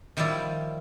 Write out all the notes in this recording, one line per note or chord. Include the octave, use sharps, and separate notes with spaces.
D#3 F3 G3 E4 D5